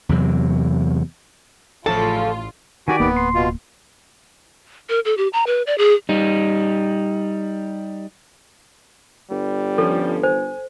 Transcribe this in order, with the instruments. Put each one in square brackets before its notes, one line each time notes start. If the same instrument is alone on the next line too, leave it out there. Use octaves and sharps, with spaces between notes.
[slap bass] E2 C3 F#3
[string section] A1 F4 [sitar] C#3 F3 A3 [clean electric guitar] A4 [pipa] A5
[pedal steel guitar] D#3 G4 D5 [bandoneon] F#4 G#5
[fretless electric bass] D1 C#2 A#3 [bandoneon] B3
[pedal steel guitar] C6
[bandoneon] B2 F4
[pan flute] A#4
A4
G4
A#5
B4
D5
G#4
[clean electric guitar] G3 D#4
[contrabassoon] G1 [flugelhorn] G3
[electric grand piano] F3 C#4 [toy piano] A4
[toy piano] C5 [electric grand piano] G#5